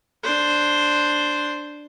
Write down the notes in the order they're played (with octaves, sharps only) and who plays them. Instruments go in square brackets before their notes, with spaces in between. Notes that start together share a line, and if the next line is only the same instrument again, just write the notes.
[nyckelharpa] D4 C5